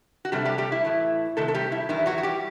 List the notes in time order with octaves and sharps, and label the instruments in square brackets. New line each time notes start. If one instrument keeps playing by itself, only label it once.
[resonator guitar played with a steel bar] F#4
C3 F#3 G3 A3 G4
G3 G4
G3 G4
E4
A2 E3 A3
C3 D#3 F#3 A3 A4
A4
G3 G4
E4
E2 D#3 G3 B3 E4
F#3 F#4
F#4
G3 G4